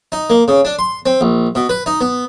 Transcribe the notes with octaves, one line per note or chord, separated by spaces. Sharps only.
D#4
A#3
C#3
D4
C6
C4
A#1
B2
B4
D#4
B3